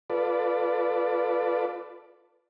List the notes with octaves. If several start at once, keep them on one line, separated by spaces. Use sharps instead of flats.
F4 A4 B4 D5